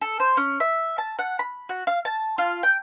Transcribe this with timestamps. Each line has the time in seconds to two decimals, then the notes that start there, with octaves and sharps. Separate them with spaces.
0.01 A4
0.20 C5
0.37 C#4
0.60 E5
0.98 A5
1.19 F#5
1.39 B5
1.69 F#4
1.87 F5
2.05 A5
2.38 F4
2.63 G5